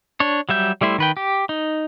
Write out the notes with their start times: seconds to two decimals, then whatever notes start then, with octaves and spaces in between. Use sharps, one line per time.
0.20 D4 C#5
0.49 F#3 G3 E5 G6
0.81 G3 A3 E4 C5
0.98 D#3 B4 G5
1.17 G4
1.49 D#4